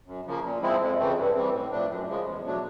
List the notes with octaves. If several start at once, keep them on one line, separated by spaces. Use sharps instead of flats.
F#2
C#3 F3 A#3
A#2
F3 G#3 C4 E4
F2
C#3 E3 A3 C4
G2
E3 G3 C4
A2
F3 A3 D4
F#2
C#3 F3 G#3
E2
B2 F#3 A3 D4